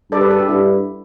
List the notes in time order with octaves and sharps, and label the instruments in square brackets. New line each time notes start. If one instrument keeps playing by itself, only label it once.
[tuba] G2 [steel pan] A4 D5
[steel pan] B4
A4
G4
[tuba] G2 [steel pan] E4